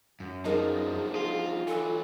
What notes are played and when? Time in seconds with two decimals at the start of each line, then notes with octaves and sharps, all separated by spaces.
0.20 F#2
0.45 B2 F3 D4 D#4 G#4 A#4
1.16 F4
1.67 E3 F#3 A4